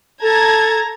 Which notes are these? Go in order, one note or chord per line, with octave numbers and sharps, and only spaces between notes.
A4 A5 A#5 G#6